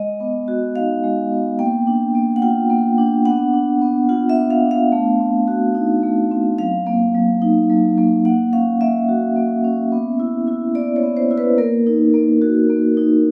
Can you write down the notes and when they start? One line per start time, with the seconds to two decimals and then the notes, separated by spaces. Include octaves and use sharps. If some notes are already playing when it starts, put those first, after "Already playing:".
Already playing: G#3 D#5
0.20 B3
0.48 F#4
0.76 D#4 F5
1.04 G#3
1.31 B3
1.59 A#3 G5
1.87 D4
2.15 A#3
2.36 F#5
2.42 F4 G5
2.70 A#3
2.98 D4
3.25 B3 F#5
3.53 D4
3.81 B3
4.09 F4 F#5
4.30 E5
4.36 B3
4.50 F5
4.64 D4
4.71 F5
4.92 A3
5.20 C4
5.48 F#4
5.75 D#4
6.03 A3
6.31 C4
6.58 F#3 F5
6.86 A#3
7.14 F#3
7.42 D#4
7.70 F#3
7.97 A#3
8.25 A#3 F#5
8.53 C#4 F5
8.81 A#3 E5
9.09 F#4
9.36 A#3
9.64 C#4
9.92 B3
10.20 E4
10.47 E4
10.75 B3 D5
10.96 C#5
11.03 B3
11.17 C5
11.31 E4
11.38 B4
11.58 A#3 A#4
11.87 D#4
12.14 A#3
12.42 F#4
12.70 A#3
12.97 D#4